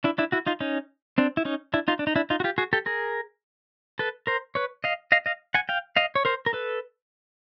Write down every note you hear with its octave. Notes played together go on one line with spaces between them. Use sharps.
D4 E4
D4 E4
E4 F#4
D#4 F4
C#4 D#4
C4 D4
E4
C#4 D#4
D4 E4
D#4 F4
D4
D#4
D4 E4
D#4 F4
F#4
F4 G4
F#4 G#4
G4 A4
G#4 A#4
A4 B4
A#4 C5
B4 C#5
D#5 F5
D#5 F5
D#5 F5
F#5 G#5
F5 G5
D#5 F5
C#5
A#4 C5
A#4
A4 B4